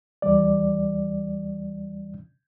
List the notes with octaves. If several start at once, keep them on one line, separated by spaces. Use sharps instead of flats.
D#2 E3 G3 D5